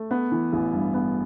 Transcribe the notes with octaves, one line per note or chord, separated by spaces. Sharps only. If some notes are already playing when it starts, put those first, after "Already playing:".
Already playing: A3
B3
E3
A1
G2
B3